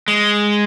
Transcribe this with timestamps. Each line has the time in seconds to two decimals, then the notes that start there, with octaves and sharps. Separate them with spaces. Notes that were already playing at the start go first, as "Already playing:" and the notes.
0.08 G#3